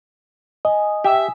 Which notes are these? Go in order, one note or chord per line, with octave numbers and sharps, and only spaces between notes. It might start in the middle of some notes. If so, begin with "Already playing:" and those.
D#5 G#5 D#6
G4 E5